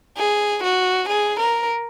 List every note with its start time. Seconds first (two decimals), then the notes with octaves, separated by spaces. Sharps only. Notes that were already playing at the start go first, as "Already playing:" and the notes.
0.17 G#4
0.63 F#4
1.09 G#4
1.40 A#4